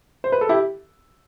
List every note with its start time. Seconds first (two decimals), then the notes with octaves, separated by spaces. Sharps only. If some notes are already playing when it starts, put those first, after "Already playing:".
0.24 C5
0.32 B4
0.41 A4
0.49 E4 G4